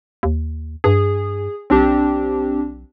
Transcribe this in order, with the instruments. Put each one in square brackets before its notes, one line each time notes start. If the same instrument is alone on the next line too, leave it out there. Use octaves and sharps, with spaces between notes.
[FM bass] D#2
[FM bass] G2 [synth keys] G#4
[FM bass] B1 [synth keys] C4 D4 G4